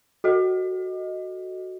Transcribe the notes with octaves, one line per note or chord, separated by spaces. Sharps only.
F#4 A4 D#5